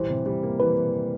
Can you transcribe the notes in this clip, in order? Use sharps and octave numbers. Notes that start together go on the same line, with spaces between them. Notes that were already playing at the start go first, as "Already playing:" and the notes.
Already playing: E3 G3 C5
C3
G3
A#3
E3 B4